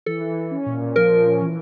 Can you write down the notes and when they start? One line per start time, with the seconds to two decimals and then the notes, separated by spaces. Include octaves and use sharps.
0.06 E3 A4
0.21 E3
0.36 E3
0.51 C#4
0.66 A#2
0.81 A#2
0.96 F3 A#4
1.11 A#2
1.26 C#4
1.41 E3